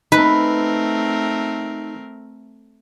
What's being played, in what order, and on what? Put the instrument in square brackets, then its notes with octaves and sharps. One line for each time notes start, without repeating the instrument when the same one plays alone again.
[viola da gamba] A3 C4 A#4 [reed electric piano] D#4 [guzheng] B4